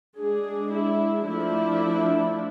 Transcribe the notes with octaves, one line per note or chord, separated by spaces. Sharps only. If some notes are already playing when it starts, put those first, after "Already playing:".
G#3 D4 G#4
E4
F3 A3 D4 E4